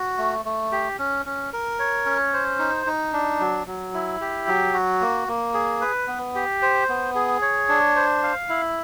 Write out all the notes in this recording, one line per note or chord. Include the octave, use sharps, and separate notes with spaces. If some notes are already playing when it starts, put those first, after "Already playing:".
Already playing: F#4
A3
A3
G4
C#4
C#4
A#4
C#5
C#4
C5
D#4
D#4
D4
F#3
F#3
E4
G4
F#3
F#4
A#3
A#3
G#4
B4
B3
G4
C5
B3
G#4
C#5
D4
C5
F5
E4